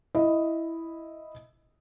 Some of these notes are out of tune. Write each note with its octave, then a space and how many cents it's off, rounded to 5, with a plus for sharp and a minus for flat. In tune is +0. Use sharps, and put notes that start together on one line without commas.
E4 +0 D#5 +0